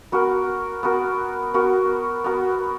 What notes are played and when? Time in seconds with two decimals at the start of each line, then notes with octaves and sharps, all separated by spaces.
0.12 B3 F#4 A#4
0.83 B3 F#4 A#4
1.54 B3 F#4 A#4
2.24 B3 F#4 A#4